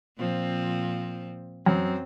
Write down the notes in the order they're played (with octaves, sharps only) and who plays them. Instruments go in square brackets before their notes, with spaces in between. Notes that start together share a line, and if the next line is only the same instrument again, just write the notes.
[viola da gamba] A#2 F3 C4
[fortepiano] F#2 [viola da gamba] C4